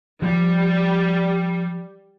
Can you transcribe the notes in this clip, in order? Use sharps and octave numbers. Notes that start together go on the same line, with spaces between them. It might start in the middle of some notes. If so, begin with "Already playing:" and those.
F3 G3